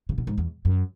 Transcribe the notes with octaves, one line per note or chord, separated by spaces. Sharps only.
C#3
B2
G#2
E2
F#2